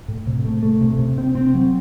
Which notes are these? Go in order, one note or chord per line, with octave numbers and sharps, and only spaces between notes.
A2
C3
A3
A3
C3
C3
C4
C4
F#3